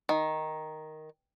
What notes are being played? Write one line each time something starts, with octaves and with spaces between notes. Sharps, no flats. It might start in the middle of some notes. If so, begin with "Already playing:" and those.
D#3